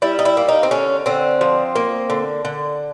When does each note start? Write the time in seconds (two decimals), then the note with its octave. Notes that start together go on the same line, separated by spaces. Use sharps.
0.02 G3 E4
0.19 D#4
0.25 E4
0.37 A#3
0.49 D#4
0.63 C4
0.71 D3 C#4
1.06 D3 C4
1.41 F3
1.76 A#3
2.10 D3
2.45 D3